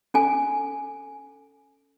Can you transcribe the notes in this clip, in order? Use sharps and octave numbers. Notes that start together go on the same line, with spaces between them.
C#4 A4 G#5